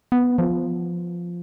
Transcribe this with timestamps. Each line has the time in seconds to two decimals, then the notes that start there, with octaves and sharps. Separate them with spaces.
0.12 B3
0.38 F3